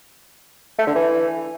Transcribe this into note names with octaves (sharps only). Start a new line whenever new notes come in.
A3
D3
E3